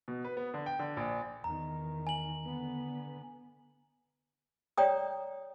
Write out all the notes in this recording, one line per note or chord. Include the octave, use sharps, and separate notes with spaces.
B2
B4
B3
D3
G5
D3
A#1
E2 D#3 A#5
G#5 F#7
D3 B3
C#5 D5 G5 A#5 D#6